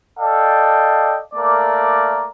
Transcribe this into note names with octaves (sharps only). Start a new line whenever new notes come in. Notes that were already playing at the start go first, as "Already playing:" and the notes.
A4 D5 D#5 F5 G5
A3 A#3 A#4 D5